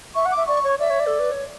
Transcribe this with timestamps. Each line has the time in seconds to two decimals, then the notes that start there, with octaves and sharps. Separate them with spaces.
0.15 E5 C#6
0.26 F#5
0.31 D6
0.37 E5
0.47 D5 C#6
0.64 C#5
0.79 D5 E5
0.90 C#5
1.00 D5
1.06 A4
1.19 B4
1.31 C#5